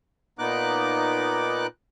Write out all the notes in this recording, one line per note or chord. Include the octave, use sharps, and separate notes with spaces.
A#2 B3 D#4 D6 F#6